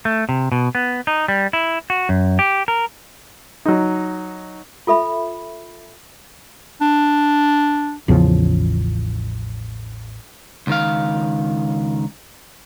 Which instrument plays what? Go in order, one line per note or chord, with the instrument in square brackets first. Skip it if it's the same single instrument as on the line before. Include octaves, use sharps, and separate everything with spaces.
[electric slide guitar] A3
C3
B2
B3
D#4
G3
E4
F#4
F#2
G4
A#4
[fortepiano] F#3 D#4
[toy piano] F4 A4 E5 B5
[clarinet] D4
[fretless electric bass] A1 E2 C#3 F3
[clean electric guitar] C#2 D#3 F5